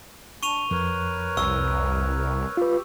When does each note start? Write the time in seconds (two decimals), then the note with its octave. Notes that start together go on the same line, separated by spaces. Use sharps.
0.43 D4 C#6 D#7 F7
0.71 F2 A#4 B4 C#5
1.37 C2 C#6 E6
2.57 F4 G4 B4